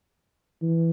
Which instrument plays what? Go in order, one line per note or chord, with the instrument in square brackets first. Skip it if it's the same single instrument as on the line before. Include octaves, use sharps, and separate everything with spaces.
[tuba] E3